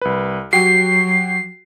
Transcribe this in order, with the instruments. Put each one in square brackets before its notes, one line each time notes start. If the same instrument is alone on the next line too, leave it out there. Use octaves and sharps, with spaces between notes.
[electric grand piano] C2 B4
[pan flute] F#3 [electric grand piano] F#4 G4 G5 [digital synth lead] C7